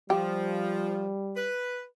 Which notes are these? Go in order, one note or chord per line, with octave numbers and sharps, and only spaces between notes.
F3 G3 G4
B4